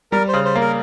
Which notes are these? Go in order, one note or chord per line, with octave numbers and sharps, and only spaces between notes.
G3 A#4
C5
C#3
C5
A#3
A#4